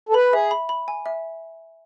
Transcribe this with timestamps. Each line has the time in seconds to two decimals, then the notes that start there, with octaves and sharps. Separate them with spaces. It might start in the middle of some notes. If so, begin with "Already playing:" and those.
0.09 A4
0.14 B4 B5
0.33 G#4 E5
0.51 B5
0.69 B5
0.88 G#5
1.06 E5